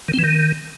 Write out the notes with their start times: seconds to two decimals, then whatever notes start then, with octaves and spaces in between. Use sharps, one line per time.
0.08 D#3
0.14 C4
0.19 E3
0.24 D#3